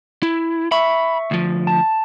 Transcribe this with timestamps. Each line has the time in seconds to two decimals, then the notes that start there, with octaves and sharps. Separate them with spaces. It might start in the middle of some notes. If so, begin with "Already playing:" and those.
0.23 E4
0.72 E5 B5 C#6
1.31 D2 F3
1.67 A5